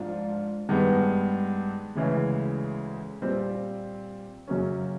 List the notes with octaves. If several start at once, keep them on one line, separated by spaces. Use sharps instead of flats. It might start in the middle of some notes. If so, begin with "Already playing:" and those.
Already playing: G#2 F3 D4 F4
G2 D#3 G#3 B3
D2 C#3 E3 G#3
A#2 G3 C4 F4
F#2 C#3 F#3 A#3 C#4